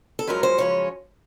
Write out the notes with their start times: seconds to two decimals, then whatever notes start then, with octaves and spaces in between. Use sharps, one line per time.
0.19 A4
0.27 F#2 C#3 F3 G#3 C#4 A#4
0.43 C5
0.58 F#2 C#3 F3 G#3 C#4 C#5